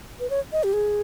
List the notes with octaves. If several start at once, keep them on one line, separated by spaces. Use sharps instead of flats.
B4
C#5
D#5
G4
G#4